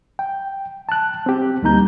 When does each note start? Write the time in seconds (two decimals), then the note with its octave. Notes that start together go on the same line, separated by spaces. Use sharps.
0.19 G5
0.89 A5 F#6
1.26 C4 G4
1.63 D2 G3 A#3 D#4 A#5 G6